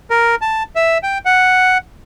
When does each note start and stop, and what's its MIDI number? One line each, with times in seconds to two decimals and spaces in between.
0.10 0.35 70
0.42 0.63 81
0.76 0.98 76
1.03 1.18 79
1.25 1.78 78